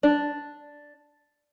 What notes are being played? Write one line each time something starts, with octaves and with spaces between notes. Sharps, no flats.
D4